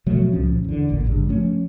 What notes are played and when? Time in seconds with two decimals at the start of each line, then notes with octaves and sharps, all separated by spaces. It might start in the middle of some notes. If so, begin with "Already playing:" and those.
0.06 B2 F3 F#3 A3
0.33 C#2 A#2 F3 C#4
0.64 E2 D3
0.88 D1 G#1 A#2
1.05 G#1 G2 C#3
1.28 F3 A3 C4 C#4